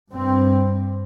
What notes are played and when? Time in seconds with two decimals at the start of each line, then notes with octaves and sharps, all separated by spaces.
0.12 G2 C4